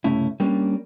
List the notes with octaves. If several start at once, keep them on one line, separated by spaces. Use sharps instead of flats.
C2 G2 C#3 A3 C#4 E4
G3 A#3 C#4 D4